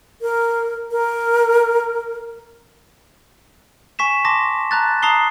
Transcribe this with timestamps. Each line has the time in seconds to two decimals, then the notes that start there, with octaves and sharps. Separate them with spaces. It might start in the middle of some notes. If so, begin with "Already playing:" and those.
0.22 A#4
0.91 A#4
3.99 G#5 C#6 B6 E7
4.25 A5 C6 D6 A#6
4.71 A5 A#5 F#6 A6
5.03 A5 A#5 D#6 C7 G7